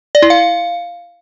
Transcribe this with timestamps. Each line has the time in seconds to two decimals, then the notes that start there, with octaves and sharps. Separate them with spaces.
0.15 D5
0.22 E4
0.30 F5